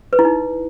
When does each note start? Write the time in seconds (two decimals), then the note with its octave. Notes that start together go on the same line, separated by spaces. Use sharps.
0.13 B4
0.19 E4
0.25 D#4